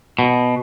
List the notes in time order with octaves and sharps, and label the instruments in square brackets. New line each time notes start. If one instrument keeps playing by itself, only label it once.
[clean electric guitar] B2